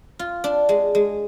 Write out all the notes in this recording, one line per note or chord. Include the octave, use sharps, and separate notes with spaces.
F4
D4
G#3
G#3